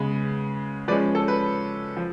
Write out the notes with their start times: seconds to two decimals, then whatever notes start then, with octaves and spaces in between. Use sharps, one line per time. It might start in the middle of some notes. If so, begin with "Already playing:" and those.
Already playing: C#3 G#3 B3 B4
0.88 F3 G#3 C#4 B4 D5
1.15 A4
1.28 B4
1.97 F3